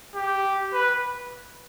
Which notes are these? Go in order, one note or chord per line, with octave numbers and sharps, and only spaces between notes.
G4
B4